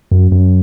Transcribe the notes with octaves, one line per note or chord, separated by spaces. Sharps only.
F#2
F#2